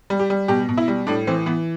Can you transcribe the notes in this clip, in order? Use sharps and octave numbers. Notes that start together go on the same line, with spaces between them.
G3
G4
G3
B2 G4
B2
E4
G3
A2 D4
E3 C4
E3 B3